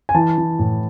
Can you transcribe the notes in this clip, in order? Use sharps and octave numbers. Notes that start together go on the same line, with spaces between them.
G#5
E3 A5
E3
A2